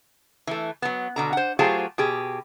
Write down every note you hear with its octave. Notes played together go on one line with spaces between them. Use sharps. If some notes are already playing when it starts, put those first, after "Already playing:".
E3 A3
F#3 B3
B2 D3 A#5
C5 F#5
F#3 A3 F4 G4 G#4 C5
B2 G4 G#4